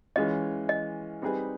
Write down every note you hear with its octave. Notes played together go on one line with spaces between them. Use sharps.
E3 G#3 C#4 F4 D#5
D#5
G3 C4 D#4 G#4 B4